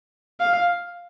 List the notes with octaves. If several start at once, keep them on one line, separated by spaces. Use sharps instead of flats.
F5